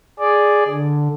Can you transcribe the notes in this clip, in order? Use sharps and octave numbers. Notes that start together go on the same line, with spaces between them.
G#4 D5
D3